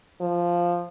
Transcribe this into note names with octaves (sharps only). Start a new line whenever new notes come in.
F3